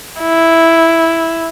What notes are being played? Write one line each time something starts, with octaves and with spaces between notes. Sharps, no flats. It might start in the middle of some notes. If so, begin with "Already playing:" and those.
E4